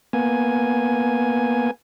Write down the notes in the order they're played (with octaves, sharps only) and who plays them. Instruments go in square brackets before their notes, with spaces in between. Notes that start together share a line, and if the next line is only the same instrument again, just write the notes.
[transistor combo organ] A#3 B3 G#5